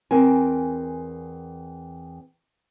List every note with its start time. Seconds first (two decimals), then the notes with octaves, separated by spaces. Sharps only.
0.11 E2 C4 A#4 G#5